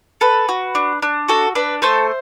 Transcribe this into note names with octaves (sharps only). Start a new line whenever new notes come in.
A4 B4
F#4
D4
D4
F#4 A4
D4 B4
A3 A4 C5